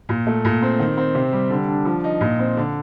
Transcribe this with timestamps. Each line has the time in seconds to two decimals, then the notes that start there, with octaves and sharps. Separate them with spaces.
0.09 A#2
0.27 A3
0.45 A#2
0.62 C4
0.79 D#3
0.98 C4
1.15 C3
1.32 G3
1.50 D3
1.68 D4
1.85 F3
2.04 D#4
2.21 A#2
2.39 C4
2.57 D3